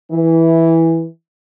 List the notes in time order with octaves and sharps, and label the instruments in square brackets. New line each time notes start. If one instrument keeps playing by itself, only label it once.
[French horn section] E3